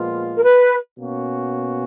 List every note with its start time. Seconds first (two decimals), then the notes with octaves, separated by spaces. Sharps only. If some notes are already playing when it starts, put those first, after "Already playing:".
Already playing: A#2 F3 G#3 B3 F4
0.37 A#4
0.43 B4
0.97 B2 A#3 C#4 F#4